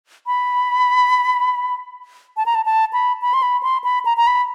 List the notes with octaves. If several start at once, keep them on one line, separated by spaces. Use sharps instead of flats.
B5
A5
A#5
A5
A5
B5
B5
C6
B5
C6
B5
A#5
A#5
B5